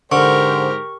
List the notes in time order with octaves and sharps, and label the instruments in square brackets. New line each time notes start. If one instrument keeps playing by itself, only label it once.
[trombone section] G#2 C5 [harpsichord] D3 [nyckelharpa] G4 A#4 [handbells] C#6